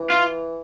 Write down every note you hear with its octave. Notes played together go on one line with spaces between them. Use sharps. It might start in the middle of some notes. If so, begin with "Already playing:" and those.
Already playing: E3
F4